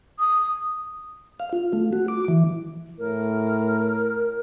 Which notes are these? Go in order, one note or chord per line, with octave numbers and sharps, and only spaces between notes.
D#6
F5
F4
A3
F#4
D6
E3
A2 A#4